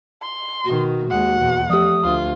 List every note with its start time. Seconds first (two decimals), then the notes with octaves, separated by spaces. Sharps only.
0.22 C6
0.65 B2 D#3 F#4
1.10 D#2 G#3 F#5
1.40 E2 B2
1.69 F3 A3 G4 D#6
2.04 D2 F4